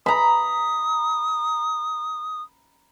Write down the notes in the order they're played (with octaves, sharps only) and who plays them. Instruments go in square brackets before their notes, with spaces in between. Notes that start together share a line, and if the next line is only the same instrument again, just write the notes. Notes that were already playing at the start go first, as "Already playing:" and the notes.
[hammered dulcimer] A#5 B5 [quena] D#6